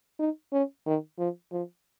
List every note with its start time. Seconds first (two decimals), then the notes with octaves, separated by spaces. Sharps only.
0.19 D#4
0.53 C#4
0.86 D#3
1.18 F3
1.52 F3